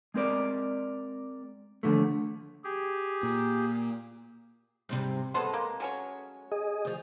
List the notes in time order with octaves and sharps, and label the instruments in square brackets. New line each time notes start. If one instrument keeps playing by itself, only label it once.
[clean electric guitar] G#3 C4 A#4 D5
D#2 A2 D3 F3 A3
[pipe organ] G4 G#4
[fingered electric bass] A#2
[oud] G#2 C3 G3
[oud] G#3 A4 [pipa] B3 C5 C6
[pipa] A#3
F#3 C#4 C#5
[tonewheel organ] G#4 D#5
[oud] D2 F3